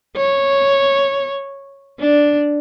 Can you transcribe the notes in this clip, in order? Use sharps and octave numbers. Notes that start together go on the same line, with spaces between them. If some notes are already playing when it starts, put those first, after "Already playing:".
C#5
D4